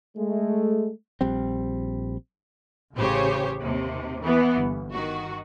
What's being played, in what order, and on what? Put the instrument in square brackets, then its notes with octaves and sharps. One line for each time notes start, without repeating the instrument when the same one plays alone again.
[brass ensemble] G#3 A3
[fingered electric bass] A#1 G3 C4
[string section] A1 C#3 G4 C5 C#5
D#2 C3
E3 B3
G1
D#3 F#4